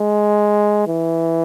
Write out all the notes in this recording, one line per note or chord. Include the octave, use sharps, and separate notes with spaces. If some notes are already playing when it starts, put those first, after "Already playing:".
Already playing: G#3
E3